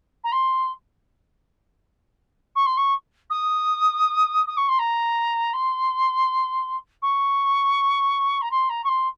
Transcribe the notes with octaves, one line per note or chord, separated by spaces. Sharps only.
A#5
C6
C#6
C6
C#6
D#6
D#6
C#6
C6
A#5
C6
C#6
A#5
C6
A#5
C#6
C6